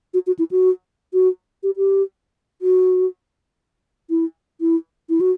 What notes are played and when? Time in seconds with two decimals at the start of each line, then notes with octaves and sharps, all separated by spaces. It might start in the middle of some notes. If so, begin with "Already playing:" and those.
0.14 F#4
0.27 F#4
0.39 E4
0.51 F#4
1.13 F#4
1.63 G4
1.77 G4
2.62 F#4
4.10 E4
4.61 E4
5.09 E4
5.20 F#4